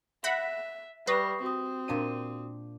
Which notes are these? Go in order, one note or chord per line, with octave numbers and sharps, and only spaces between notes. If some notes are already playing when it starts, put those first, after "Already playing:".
E5 F#5 B5 A#6 B6
G3 B4 C#6 D#6 A#6 C7
C4 F#4 D#6
A#2 D4 D#7